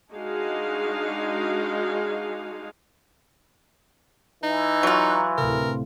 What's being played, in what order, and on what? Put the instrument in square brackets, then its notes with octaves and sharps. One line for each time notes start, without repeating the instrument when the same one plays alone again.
[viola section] G#3 D4 D#4 F#4 G#4 F5
[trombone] E3 [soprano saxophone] D#4
[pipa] F#3 F4 [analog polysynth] A#5 C#6 F#6
[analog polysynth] D2 A2 C3 [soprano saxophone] A#4